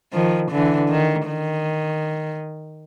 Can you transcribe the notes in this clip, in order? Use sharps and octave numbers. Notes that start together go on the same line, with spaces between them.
D#3 F3
D3 E3
D#3
D#3